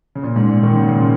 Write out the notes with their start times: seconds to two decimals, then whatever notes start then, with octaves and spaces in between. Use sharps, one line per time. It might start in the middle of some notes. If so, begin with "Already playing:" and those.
0.15 C#3
0.23 A#2
0.36 G#2
0.49 A#2
0.63 D#3
0.75 C#3
0.88 A#2
1.00 C#3